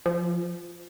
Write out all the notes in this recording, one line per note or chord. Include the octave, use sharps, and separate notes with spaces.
F3